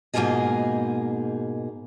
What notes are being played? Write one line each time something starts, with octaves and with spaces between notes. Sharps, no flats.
G#2 B2 A#3 F4 G#4 D#5